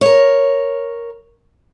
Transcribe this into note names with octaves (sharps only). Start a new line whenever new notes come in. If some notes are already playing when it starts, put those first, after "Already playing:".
A#4 C#5